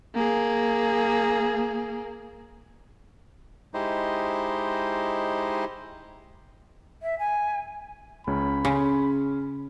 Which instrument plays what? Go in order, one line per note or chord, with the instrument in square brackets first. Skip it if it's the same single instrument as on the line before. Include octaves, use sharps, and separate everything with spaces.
[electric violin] A#3 G#4
[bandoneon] G#3 D#4 E4 G4 C5 D#5
[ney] E5
G#5
[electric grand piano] C#2 C#4 [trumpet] B5
[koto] C#3 [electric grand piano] C#4 G#4 C6